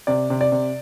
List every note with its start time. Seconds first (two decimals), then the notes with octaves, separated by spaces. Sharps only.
0.07 C3 D5
0.30 C3
0.41 D5
0.52 C3